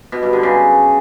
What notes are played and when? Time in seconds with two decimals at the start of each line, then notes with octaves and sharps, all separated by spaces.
0.12 B2
0.23 G2
0.33 D3
0.43 C#3